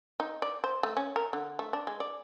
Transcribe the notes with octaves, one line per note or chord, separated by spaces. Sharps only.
D#4
D5
C5
A3
C#4
A#4
D3
A3
D4
G#3
D5